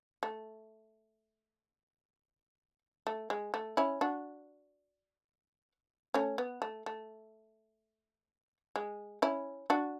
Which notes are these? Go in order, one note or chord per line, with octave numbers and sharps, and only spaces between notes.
A3
A3
G#3
A3
C#4 E4
D4 F#4
A3 C#4
B3
A3
A3
G#3
C#4 E4
D4 F#4